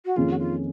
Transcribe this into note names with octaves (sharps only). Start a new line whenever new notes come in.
F#4
F2 D#3 A#3 C#4 F4 G#4
F#4
F4